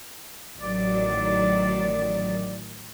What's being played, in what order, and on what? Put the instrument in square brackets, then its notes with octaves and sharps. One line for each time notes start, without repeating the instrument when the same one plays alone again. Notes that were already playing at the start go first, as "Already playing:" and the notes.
[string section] A1 D#3 F#3 [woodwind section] D5